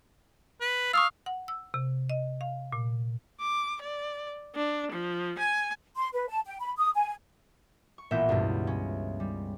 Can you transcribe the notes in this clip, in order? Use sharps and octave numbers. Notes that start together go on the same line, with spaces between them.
B4
F5 C#6 D#6 E6
F#5
E6
C3
D#5
F5
A#2
D6
D5
D4
F3
G#5
C6
B4
A5
G5
B5
D#6
G#5
C#6
A1 A#2 A#3 B3 E5 G6
C#2 G2 B2
C#4
G3